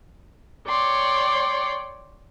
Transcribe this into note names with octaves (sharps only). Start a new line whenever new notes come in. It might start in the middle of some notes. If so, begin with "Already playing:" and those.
C#5 D5 G5 C6